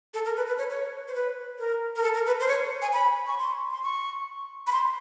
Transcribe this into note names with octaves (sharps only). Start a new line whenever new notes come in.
A4
A#4
B4
B4
C#5
C#5
C5
B4
A#4
A#4
A4
A#4
B4
C5
C#5
G#5
B5
C#6
C6
C6
C#6
B5
C6